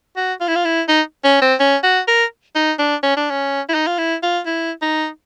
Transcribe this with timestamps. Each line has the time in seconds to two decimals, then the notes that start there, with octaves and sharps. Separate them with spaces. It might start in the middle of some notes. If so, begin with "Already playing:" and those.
0.16 F#4
0.41 F4
0.48 E4
0.56 F4
0.65 E4
0.88 D#4
1.24 C#4
1.42 C4
1.60 C#4
1.83 F#4
2.08 A#4
2.55 D#4
2.79 D4
3.03 C#4
3.17 D4
3.30 C#4
3.69 E4
3.74 D#4
3.87 F4
3.98 E4
4.23 F4
4.46 E4
4.82 D#4